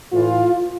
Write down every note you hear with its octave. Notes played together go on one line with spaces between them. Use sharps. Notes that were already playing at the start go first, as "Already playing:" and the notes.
A2 E3 F4